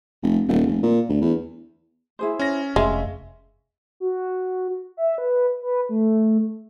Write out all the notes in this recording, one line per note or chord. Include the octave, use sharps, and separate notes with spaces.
F1
D#1
F1
A#2
D2
E2
E4 G#4 C5
C#4 A#6
F1 G#3 E5 F5
F#4
E5
B4
B4
A3